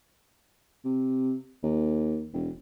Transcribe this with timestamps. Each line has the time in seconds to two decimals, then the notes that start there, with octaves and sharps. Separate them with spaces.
0.85 C3
1.63 D#2
2.34 E1